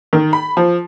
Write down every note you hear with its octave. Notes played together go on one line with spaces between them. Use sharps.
D#3
B5
F3